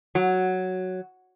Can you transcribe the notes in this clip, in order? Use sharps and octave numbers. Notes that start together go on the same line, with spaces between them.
F#3